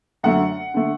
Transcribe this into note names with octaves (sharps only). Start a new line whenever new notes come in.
F#2 D3 A3 F#5
D3 A3